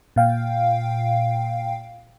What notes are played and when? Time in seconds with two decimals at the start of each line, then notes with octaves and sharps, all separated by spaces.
0.16 A#2 F5 G5